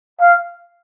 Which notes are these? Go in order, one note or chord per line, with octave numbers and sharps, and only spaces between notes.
F5